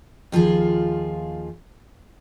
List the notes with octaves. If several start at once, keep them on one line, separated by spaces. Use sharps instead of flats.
D#2 F3 F4 G#4